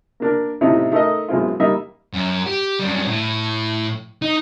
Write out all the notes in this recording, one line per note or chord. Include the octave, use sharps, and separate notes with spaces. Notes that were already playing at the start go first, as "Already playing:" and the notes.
A#3 D4 A#4
A2 C3 F3 A3 D#4 E4
A3 D#4 A4 A#4 D#5
F#2 B2 G#3 C4 E4 F4
G3 A#3 D#4 D#5 E5
F#2
G4
F#2 G3
A2
D#4